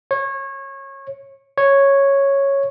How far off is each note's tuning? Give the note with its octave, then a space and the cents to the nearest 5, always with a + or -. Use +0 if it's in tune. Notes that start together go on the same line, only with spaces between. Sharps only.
C#5 -25
C#5 -5